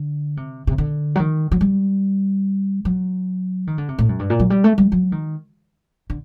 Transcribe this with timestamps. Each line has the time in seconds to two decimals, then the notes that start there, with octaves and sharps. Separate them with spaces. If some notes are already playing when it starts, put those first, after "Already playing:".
Already playing: D3
0.37 C3
0.67 C3
0.78 D3
1.15 F#3
1.19 D#3
1.52 F#3
1.61 G3
2.85 F#3
3.67 D#3
3.78 D3
3.89 C3
3.98 A2
4.09 F#2
4.19 G2
4.30 A#2
4.39 F#3
4.50 G3
4.64 A3
4.78 G3
4.92 F#3
5.12 D#3
6.10 D3